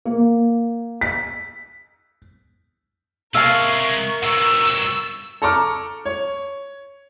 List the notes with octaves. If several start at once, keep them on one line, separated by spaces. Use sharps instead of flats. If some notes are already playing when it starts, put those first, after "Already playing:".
A#3
B6
C3 G#3 A#4 E5 F5 A5 C#6
G2 B2 E6
A4 A#5 C#6 D6 F6
C#5